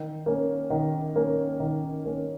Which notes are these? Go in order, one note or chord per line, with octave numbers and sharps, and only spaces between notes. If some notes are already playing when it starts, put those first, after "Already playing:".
Already playing: D#3
A#3 C#4
D#3
A#3 C#4
D#3
A#3 C#4